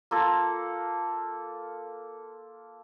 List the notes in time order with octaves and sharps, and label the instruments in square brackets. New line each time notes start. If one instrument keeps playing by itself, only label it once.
[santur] A#3 F4 A4